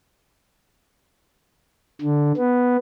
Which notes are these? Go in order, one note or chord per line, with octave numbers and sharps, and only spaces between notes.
D3
B3